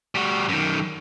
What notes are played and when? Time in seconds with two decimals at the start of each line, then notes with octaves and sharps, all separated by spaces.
0.15 G3 F#4
0.49 F#2 D#3